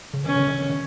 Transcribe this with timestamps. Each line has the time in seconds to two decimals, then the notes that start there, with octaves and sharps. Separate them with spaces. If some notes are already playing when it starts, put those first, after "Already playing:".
0.14 C#3
0.25 D#3 C#4
0.36 C#3
0.48 D#3
0.58 C#3
0.70 D#3